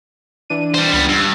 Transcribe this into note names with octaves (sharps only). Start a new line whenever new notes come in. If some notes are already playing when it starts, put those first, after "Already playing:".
E3 D4 D#7
G3 C5
C#2 G3 B3
G2 E6